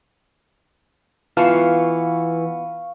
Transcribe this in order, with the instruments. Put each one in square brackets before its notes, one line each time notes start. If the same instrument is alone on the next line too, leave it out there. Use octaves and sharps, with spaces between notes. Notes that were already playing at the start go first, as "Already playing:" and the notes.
[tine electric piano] E3 [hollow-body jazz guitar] B3 F4 A5 [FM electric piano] F5 C#6